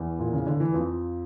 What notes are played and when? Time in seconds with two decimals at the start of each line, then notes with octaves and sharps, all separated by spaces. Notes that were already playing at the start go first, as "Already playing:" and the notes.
Already playing: E2 E3
0.19 A#2
0.33 C#3
0.47 D3
0.60 E3
0.74 F2 F3